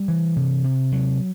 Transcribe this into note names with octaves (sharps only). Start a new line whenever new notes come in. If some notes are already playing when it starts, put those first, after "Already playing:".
Already playing: G3
E3
C3
C3
F#3